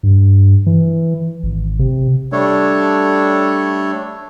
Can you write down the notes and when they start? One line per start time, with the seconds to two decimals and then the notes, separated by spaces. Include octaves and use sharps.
0.03 G2
0.66 E3
1.43 G#1
1.79 C3
2.32 G3 A3 D4 A4 C#5